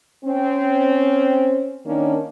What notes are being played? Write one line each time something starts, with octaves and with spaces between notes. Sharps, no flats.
C4 C#4
D#3 A#3 C#4 D4